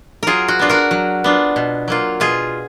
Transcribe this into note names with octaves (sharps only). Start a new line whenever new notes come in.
F#3 F4 G#4 A#4
F#4
B3 D4 F4
F#4 A#4
F#3
B3 D4 F4
B2
F#3 A#3 F4
B2 F4 G#4